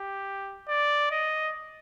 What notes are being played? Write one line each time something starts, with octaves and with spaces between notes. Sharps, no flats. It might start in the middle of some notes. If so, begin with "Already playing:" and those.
Already playing: G4
D5
D#5